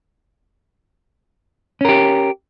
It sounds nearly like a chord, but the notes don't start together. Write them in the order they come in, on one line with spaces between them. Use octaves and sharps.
C#4 A#4 G4